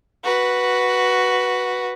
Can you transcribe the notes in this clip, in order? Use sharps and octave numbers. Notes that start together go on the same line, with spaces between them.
F#4 B4